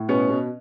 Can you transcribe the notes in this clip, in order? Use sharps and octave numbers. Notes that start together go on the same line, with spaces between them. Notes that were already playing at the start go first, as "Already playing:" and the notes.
Already playing: A2
B2 B3 C#4
B2